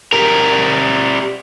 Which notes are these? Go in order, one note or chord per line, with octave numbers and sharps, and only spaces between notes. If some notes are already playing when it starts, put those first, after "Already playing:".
G3 A#4